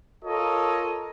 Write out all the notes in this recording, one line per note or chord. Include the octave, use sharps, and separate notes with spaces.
F4 A4 A#4 C#5 D#5